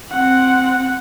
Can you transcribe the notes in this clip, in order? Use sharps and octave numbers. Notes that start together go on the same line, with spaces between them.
C4 F#5